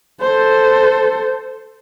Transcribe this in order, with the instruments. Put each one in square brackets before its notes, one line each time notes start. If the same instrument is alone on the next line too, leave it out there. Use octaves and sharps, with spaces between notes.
[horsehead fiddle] A4 C5